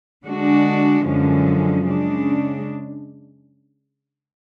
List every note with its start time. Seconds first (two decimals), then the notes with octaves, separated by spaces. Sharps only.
0.24 D3 G#3 D4 F#4
1.05 F#2 D3 F3 G#3 C#4
1.85 C#3 G#3 D4